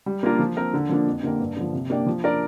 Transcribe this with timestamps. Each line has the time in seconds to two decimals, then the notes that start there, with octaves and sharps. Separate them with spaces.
0.06 G3
0.23 A#3 D4 F4 A#4
0.39 F3
0.57 C4 A#4
0.74 D3
0.89 F3 A#3 D4
1.06 F2
1.23 D3 A#3 G4 A#4
1.40 G2
1.56 D3 F3
1.73 C3
1.90 A#3 D4 G4 D5
2.07 F3
2.24 D4 A#4 D5